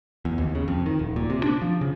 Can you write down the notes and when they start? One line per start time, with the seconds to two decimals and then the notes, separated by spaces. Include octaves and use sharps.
0.25 E2
0.38 D#2
0.55 C#3
0.68 F2
0.86 D#3
0.99 D#1
1.16 A#2
1.30 C3
1.43 D4
1.62 F3
1.81 C#3